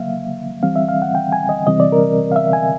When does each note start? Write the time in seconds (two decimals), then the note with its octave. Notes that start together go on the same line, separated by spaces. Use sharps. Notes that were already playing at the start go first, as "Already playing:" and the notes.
Already playing: C#3 F#3 A#3 E5 F5
0.63 E3 G3 C4 F5
0.76 E5
0.88 F5
1.02 F#5
1.15 G5
1.32 G#5
1.49 D#5
1.67 C3 E3 G3 C4 D#5
1.80 D5
1.92 A#4
2.32 F5
2.36 E5
2.53 G#5